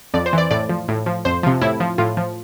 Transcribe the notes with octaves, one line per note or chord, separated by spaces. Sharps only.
F2 D5
C5
E3 D5
A2 D5
F3
A2
F3
F2 C5
C3 F3
A2 E4
F3
A2 F4
F3